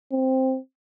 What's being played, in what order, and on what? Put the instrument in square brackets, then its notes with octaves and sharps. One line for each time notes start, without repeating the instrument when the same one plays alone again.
[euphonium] C4